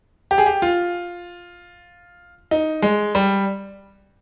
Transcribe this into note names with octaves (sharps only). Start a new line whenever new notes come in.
G4
G#4
G4
F4
D#4
G#3
G3